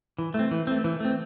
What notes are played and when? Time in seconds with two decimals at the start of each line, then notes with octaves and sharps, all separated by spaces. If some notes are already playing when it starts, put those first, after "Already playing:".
0.18 E3
0.34 A3 C4
0.51 E3
0.67 A3 C4
0.84 E3
1.00 A3 C4